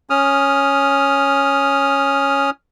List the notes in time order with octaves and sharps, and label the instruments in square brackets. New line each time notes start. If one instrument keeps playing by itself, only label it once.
[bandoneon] C#4 D#6 F6